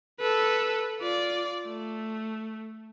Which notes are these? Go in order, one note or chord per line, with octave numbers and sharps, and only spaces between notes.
A4 B4
F4 D5
A3